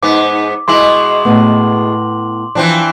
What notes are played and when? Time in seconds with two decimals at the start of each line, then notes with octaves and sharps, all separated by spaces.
0.03 G#2 B3 D6
0.68 B2 G#3 E4 C6 D6 F#7
1.25 A2 B3
2.55 E3 F3 C4 D4